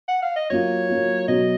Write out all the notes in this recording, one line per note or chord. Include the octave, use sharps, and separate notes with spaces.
F#5
F5
D#5
F#3 A#3 F4 C#5
F#3 A#3 F4
B2 F#3 B3 D#5